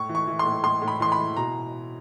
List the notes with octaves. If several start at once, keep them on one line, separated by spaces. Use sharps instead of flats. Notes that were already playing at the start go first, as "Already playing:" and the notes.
Already playing: A2 C#6
E3
C#6
E3
C6
A2
A2 C6
A2
B5
E3 C6
B5
E3
B2 A#5